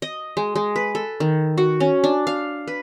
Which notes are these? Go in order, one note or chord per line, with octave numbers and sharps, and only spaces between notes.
D#5
G#3
G#3
B4
A4
D#3
F#4
C#4
D4
F5
B4